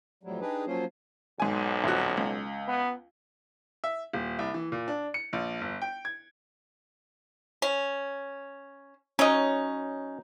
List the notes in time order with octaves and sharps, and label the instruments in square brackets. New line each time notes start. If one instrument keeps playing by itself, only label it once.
[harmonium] F2 A2 F#3 G3
D4 D#4 G4 G#4 B4
F3 F#3 A#3 C#4 F4 C5
[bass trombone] B1 [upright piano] G#2 G#5
[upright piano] D#1 F2 F#4
C#2
[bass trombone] B3
[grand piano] E5
D#1
C2
E3
A#2
D4
C#7
A#1
G1
G5
G#6
[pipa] C#4
[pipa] F#3 D#4 [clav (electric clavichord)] C#4 D#5